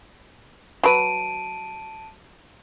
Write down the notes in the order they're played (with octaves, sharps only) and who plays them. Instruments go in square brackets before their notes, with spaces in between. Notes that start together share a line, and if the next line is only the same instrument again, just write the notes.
[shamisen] F#3 B4 [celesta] A5 D7 D#7